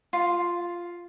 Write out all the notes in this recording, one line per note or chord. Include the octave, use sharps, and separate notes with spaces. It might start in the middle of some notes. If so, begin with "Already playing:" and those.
F4